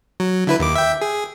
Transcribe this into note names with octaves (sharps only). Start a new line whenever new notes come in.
F#3
D3 E4 B4
D#2 D6
E5 G5
G#4